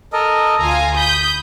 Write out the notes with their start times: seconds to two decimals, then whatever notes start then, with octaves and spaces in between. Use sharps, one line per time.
0.13 A4 A#4 D#5
0.59 D2 F4 G#5 A#5
0.96 B5 D#6 G6